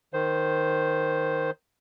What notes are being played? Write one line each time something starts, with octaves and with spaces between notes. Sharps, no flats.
D#3 C5